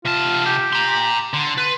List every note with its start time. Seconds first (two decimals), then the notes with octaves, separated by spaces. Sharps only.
0.05 C3 F4 A5
0.46 G4
0.72 A#5 C6
1.34 D3 C6
1.58 B4 C6